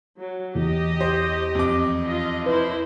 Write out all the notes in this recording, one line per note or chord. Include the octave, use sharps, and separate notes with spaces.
F#3
E2 G4 D#5
C5
F2 D6
F4 D#5
E4 B4 C5